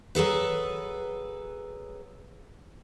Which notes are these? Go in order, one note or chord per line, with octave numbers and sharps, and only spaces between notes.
F#3 G#4 A4 B4